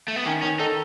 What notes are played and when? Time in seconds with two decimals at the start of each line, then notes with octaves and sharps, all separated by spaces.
0.08 A3
0.16 B3
0.26 D#3 C#4
0.42 D#3 C#4
0.59 D#4 A4